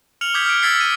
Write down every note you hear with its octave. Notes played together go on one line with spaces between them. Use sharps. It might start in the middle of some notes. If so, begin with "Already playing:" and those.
F6 C#7 F7 F#7
D6 D#6 G6 G#6 B6
F6 D7
E6 G#6 A6 B6 C7
D#7